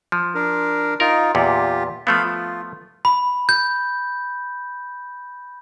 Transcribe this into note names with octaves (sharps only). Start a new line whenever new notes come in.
F3
D4 A#4
D#4 F4 A#4
E2 A#2 F4 G4
F3 A3 B3 F5 B5
F4
B5
G6